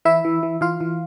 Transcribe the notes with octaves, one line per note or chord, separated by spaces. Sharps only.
E3 E4 E5
E3
E3
E3 F4 F5
E3